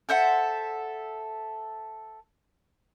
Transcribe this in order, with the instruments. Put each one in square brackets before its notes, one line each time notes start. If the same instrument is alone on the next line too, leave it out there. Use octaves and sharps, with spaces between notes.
[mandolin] A4 C5 E5 F#5